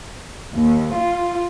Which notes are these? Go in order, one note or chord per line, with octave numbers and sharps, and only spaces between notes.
D#2
F4